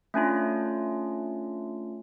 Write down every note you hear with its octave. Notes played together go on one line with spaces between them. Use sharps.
A3 C#4 D4 F4